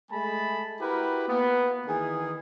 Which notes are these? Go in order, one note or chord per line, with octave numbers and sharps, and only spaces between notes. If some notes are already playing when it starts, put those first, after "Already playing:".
G#3 A3 G#5 A5 B5
E4 F#4 G4 A#4 B4
A#3 B3
D#3 E3 G#4